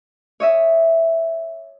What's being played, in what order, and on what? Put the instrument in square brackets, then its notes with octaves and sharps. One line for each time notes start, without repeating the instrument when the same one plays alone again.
[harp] C#5 D#5 E5